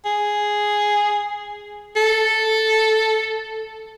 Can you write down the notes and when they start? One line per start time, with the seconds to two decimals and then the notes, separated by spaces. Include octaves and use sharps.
0.05 G#4
1.96 A4